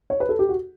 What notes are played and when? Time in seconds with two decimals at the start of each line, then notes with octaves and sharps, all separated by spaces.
0.10 C#5
0.20 B4
0.29 A4
0.39 G4
0.49 F#4